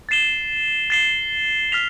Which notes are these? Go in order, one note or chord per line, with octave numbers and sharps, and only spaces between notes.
A6 C7 E7 G7
A6 C7 E7 G7
F6 B6 F7